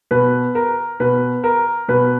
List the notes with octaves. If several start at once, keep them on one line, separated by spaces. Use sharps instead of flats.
B2 B4
A#4
B2 B4
A#4
B2 B4